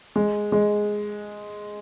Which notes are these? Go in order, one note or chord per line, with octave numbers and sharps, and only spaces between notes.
G#3
G#3